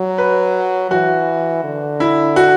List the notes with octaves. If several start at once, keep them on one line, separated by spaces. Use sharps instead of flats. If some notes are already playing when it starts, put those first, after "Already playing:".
Already playing: F#3
B4
E3 F#4
D3
E4
F#4